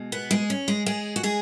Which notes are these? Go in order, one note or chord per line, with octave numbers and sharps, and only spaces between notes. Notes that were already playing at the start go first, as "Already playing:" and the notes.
Already playing: B2 G#3
B3 B4
G#3 G#4
C#4
G#3 G#4
G#3 G#4
F#4
G#3 G#4